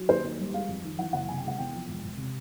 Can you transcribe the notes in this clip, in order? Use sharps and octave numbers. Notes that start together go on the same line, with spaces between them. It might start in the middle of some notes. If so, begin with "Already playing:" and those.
Already playing: F#3
D#2 C5
D#2
G3
G#3 F5
F2
D#3
E3 F#5
F#1 F#5
C3 G#5
G5
G#3 F#5
E2 G5
F3
E1
E1
C3